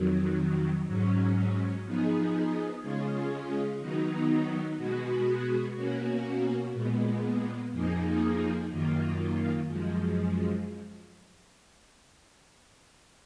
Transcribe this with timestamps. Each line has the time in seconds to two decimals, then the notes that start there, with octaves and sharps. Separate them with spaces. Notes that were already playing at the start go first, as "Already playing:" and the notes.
Already playing: F2 D#3 F#3
0.86 G#2 F#3 C#4
1.84 F3 B3 D#4 G#4
2.81 C#3 G#3 C#4 F4 G#4
3.80 D#3 F#3 B3 D#4
4.77 B2 G#3 B3 F#4
5.75 B2 A#3 C#4 F#4
6.73 A#2 G#3 B3
7.72 F2 F3 A#3 D#4 G#4
8.69 F#2 D#3 A#3 F4
9.67 F#2 F3 G#3